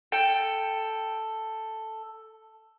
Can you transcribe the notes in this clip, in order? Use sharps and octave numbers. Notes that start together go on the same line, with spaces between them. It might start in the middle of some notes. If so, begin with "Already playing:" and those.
A4 G5